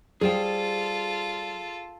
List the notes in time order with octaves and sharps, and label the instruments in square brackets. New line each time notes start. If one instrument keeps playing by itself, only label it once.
[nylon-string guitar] G3 [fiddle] F4 A4 [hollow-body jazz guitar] G#4 C5 G5